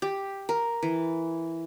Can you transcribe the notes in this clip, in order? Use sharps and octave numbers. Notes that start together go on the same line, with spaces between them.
G4
A#4
E3